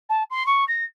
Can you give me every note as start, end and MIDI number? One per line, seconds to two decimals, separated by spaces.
0.10 0.24 81
0.31 0.46 84
0.46 0.65 85
0.68 0.85 94